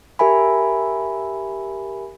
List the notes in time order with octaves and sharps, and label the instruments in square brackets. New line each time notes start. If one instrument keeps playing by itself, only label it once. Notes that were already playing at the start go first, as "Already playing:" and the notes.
[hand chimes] G4 A#4 E5 G#5 B5